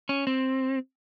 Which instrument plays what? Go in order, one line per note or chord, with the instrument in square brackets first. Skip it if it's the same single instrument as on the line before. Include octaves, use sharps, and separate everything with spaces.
[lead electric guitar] C#4
C4